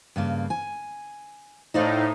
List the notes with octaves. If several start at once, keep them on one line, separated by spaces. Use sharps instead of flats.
G2 C#3 A#3
G#5
A2 D#4 C5 D5 F5